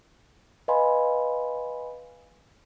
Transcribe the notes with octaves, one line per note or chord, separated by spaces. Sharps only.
B4 D#5 F5 G#5 B5 C6